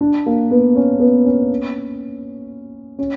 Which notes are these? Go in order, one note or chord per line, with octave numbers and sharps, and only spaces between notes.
D4
A#3
B3
C#4
B3
C#4
C#4